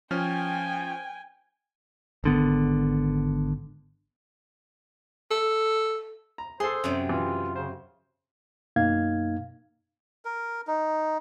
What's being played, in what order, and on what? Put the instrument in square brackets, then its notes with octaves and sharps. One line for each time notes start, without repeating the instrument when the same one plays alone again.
[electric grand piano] F3 C#4 F6 [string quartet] G5 G#5
[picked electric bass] G#1 D3 B3
[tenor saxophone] A4
[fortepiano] A#5
[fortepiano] G#4 A4 [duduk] C5 [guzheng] C6
[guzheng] F#2 C3
[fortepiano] E3 [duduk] F4
[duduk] C#3 [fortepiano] C5
[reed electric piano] F#2 B2 A#3 D#4 F5 G#6
[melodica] A#4
D#4